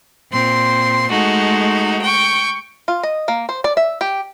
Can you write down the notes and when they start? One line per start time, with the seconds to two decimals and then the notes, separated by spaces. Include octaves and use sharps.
0.31 A#2 C4 C6
1.10 G#3 A3 D#4 F#4
2.02 G5 C#6
2.88 F4
3.03 D#5
3.28 A#3
3.49 C5
3.64 D5
3.77 E5
4.01 G4